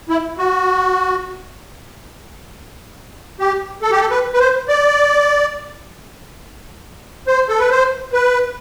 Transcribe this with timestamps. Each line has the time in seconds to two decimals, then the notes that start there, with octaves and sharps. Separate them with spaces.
0.09 E4
0.38 F#4
3.40 G4
3.82 A4
3.91 G4
4.00 A4
4.11 B4
4.34 B4
4.40 C5
4.68 D5
7.27 C5
7.49 A4
7.59 B4
7.70 C5
8.13 B4